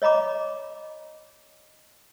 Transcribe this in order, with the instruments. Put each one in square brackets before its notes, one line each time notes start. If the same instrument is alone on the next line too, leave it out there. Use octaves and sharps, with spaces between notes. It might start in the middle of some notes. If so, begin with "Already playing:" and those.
[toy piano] C#5 D#5 A#5 B5 D6